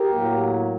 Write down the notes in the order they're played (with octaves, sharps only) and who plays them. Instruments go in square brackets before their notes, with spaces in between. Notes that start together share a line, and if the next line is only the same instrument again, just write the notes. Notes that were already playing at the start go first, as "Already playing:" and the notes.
Already playing: [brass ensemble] G4 A#4
A2 F#3 A#3